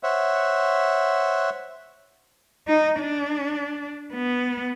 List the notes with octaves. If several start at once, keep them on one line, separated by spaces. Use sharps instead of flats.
C5 C#5 E5 F#5
D#4
D4
B3